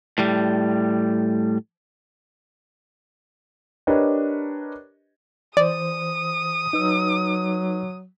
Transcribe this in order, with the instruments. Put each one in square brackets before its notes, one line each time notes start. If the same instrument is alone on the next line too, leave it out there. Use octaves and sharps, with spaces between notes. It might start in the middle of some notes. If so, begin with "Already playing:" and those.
[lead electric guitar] A2 G3
[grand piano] D4 G4 A#4 B4 C#5 D#5
[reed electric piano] E3 C5 [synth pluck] D5 [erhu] D#6
[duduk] F#3 [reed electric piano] D#4 B4 E6